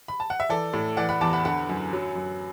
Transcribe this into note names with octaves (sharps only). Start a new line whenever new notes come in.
B5
A5
F#5
E5
E3 A4 D5
A2
E3 D5 F#5
F#5 B5
E2 A5 D6
F#5 B5
D3 F#5 B5
F#2
F#3
F#2